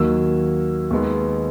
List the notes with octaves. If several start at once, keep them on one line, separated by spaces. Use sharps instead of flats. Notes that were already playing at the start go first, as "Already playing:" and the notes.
Already playing: D#2 D#3 F#3 A#3 E6
D#2 D#3 G#3 B3